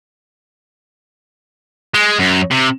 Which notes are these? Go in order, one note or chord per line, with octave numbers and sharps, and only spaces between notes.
G#3
F#2
C3